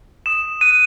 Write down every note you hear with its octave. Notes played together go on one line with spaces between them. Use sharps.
D#6 E7
F#6 D#7